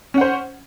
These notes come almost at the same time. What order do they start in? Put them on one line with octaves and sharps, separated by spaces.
C#4 F#5 C5